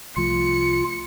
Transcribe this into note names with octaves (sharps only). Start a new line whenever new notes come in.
C2 F3 A3 F4 C#7